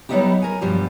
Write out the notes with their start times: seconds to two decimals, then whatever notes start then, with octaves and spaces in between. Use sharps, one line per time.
0.09 F#3 G3 B3 D#4 E4 G4
0.42 A#4 G#5
0.61 G2 B2 F3 G3